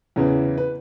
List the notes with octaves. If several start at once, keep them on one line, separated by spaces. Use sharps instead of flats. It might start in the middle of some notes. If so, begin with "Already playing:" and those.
E2 C#3 E3
B4